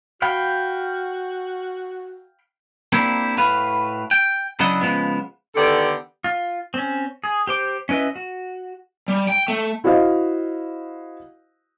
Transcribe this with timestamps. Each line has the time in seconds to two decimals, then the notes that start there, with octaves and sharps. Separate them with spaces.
0.22 F#4 F5 G5 B5
2.93 A#3 C4 D4 E4 G4
3.37 A2 F#4 B4 F5
4.11 G5
4.60 C#3 F#3 D4 E4 D#5 F#5
4.81 C#3 E3 F3 G#3 B3
5.55 D3 D#3 B3 G4 A4 D5
6.24 F4
6.74 C4 C#4
7.24 G#4
7.47 G4 C5 D6
7.89 C#4 E4 B4 D#5 E5
8.16 F#4
9.08 G3
9.28 G5
9.48 A3
9.84 E4 F#4 C5 D#5 F5